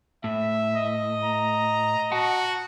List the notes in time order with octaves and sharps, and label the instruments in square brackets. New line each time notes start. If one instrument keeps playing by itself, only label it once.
[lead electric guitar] A2 [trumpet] E5
[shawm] D#5
[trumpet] A#5
[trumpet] F#4 [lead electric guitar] F#5 A5